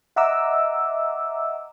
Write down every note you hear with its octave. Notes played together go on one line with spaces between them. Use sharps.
D#5 E5 F#5 A#5 D6 E6